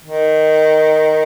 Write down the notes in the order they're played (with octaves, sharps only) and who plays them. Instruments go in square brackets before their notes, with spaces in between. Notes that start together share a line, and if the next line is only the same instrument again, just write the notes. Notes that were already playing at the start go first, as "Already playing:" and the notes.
[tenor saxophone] D#3